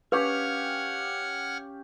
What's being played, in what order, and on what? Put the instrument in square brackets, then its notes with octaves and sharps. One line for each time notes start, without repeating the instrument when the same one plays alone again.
[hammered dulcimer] C#4 G4 F5 [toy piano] B4 [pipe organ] F#5 F6 G#6